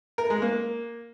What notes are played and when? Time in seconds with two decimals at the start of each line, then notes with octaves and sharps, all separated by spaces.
0.18 A#4
0.30 G#3
0.42 A#3